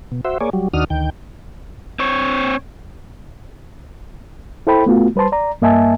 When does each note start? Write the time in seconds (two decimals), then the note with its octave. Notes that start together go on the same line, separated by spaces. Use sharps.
0.12 B2
0.25 F#4 C5 E5
0.41 A#3 G#4 C#5 D5
0.53 F#3 G3
0.74 D#2 D#3 D4 F#4 D#6 F6
0.90 D2 D#3 G5
1.99 C4 C#5
4.67 E4 A4 C5 G5 B5
4.86 A3 B3 F4 F#4
5.16 G3 B4 C5 A5 C6
5.32 D5 A#5
5.62 G2 A#3 D#5 E5 G#5 A5